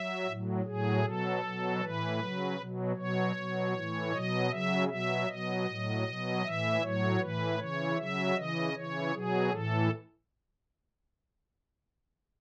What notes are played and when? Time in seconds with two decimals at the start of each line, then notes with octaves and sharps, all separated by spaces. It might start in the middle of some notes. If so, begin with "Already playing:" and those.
Already playing: F#3 E5
0.26 A2 F#3
0.65 A2 F#3 G#4
1.03 B2 F#3 A4
1.43 B2 F#3
1.81 A2 E3 B4
2.20 C#3 F#3
2.57 B2 F#3
2.96 B2 F#3 C#5
3.35 B2 F#3
3.73 A2 E3
4.11 B2 F#3 D#5
4.50 C#3 F#3 E5
4.88 B2 F#3 E5
5.27 B2 F#3 D#5
5.66 A2 F#3
6.04 B2 F#3
6.43 A2 E3 E5
6.81 A2 F#3 C#5
7.19 A2 E3 B4
7.58 C#3 E3 C#5
7.97 C#3 F#3 E5
8.35 C#3 E3 D#5
8.73 C#3 E3 C#5
9.12 B2 F#3 G#4
9.50 A2 E3 A4